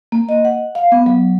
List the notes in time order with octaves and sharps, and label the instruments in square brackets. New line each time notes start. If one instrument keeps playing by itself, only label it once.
[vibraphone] A#3
D#5
F#5
F5
B3
F#3